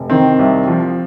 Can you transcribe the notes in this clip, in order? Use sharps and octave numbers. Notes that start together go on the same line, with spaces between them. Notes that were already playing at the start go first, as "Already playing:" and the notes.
Already playing: F1
D#3 C4
C2
F3